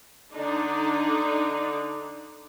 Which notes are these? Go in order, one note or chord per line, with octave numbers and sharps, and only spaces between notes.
D3 D4 D#4 D5